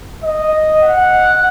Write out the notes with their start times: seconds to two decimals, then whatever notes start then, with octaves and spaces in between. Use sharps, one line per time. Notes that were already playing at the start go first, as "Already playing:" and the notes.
0.24 D#5
0.83 F#5